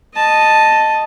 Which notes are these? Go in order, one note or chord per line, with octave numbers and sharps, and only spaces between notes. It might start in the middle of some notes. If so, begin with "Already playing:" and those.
D#5 A5